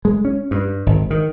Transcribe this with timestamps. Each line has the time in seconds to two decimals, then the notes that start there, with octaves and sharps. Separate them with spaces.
0.05 G#3
0.25 C#4
0.51 G2
0.86 G#1
1.10 D#3